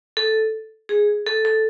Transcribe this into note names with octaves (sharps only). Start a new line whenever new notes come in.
A4
G#4
A4
A4